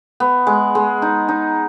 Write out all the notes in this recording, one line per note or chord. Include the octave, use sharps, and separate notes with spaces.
B3
G#3
G#3
D#4
D#4